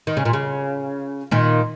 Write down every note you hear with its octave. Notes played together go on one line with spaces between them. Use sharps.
D#3
C#3
A#2
C#3
A#2 D#3